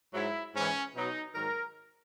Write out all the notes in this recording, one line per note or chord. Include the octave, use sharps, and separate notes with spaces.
G#2 F#3 E4
G#2 E3 C#4
B2 F#3 D#4
G#2 D#3 F#3 A#4